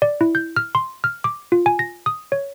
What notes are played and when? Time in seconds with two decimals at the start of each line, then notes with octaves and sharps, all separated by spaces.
0.02 D5
0.21 E4
0.35 G6
0.56 F6
0.75 C6
1.04 F6
1.24 D6
1.52 F4
1.66 G#5
1.79 A#6
2.06 D#6
2.32 C#5